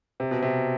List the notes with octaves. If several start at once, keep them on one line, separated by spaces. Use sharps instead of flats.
C3
B2
C3